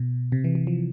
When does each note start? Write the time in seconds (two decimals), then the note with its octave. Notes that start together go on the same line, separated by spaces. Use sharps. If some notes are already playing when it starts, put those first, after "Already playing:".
Already playing: B2
0.32 C3
0.44 E3
0.55 E3
0.67 F3